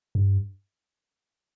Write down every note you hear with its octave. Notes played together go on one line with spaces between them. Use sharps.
G2